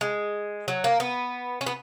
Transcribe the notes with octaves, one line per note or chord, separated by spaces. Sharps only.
G#3
F#3
A#3
B3
C#4
B3